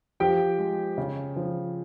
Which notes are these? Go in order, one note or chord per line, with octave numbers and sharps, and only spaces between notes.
F3 G4 G5
G#3
C#3
F3